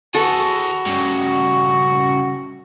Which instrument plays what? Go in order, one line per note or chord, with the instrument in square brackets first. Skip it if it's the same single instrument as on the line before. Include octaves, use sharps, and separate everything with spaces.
[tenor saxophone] F#4 [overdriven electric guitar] G#4 B4 [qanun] A4
[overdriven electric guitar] G2 C#3